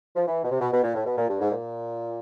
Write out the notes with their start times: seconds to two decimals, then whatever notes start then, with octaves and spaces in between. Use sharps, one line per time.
0.16 F3
0.27 E3
0.44 B2
0.50 C3
0.61 B2
0.72 B2
0.83 A#2
0.95 A2
1.06 B2
1.18 A#2
1.29 G2
1.41 G#2
1.51 A#2